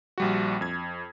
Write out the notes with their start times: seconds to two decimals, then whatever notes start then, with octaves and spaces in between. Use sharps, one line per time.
0.18 A#1 G3 F#4
0.61 F2 G#6